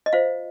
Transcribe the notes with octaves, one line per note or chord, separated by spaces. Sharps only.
D#5
F4 C5 F5